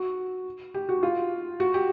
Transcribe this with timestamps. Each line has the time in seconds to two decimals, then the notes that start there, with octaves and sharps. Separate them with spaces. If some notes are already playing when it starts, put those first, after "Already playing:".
Already playing: F#4
0.74 G4
0.89 F#4
1.03 F4
1.60 F#4
1.74 G4